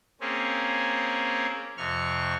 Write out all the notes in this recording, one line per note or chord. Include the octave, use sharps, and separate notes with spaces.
A#3 C4 C#4 G#4
F2 C3 C#6 F6